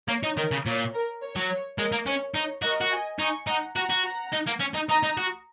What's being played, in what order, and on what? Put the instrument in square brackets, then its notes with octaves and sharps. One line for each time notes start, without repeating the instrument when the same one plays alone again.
[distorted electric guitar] A#3 [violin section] C#5
[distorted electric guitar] D#4
[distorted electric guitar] D#3 [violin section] A#4
[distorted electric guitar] C#3
[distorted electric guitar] A#2 [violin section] C#5
[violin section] A#4
C#5
[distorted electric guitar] F#3
[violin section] C#5
[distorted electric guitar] G#3 [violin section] A#4 D#5
[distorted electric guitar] A#3
[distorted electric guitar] C#4 [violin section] C#5
[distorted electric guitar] D#4 [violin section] C#5
[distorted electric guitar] F#4 [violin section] A#4 D#5
[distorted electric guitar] F#4
[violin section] D#5 G#5
[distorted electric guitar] D#4 [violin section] G#5 C#6
[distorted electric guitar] D#4 [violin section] F#5 A#5
[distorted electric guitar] F#4 [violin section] F#5 A#5
[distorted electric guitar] F#4
[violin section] F#5 A#5
[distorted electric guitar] D#4
A#3
C#4
D#4
[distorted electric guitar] D#4 [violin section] A#5 D#6
[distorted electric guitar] D#4
F#4